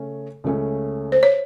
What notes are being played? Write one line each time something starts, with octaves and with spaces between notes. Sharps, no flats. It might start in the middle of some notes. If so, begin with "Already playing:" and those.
Already playing: C#3 A3 C#4
C#2 C#3 A3 C#4
C5
C#5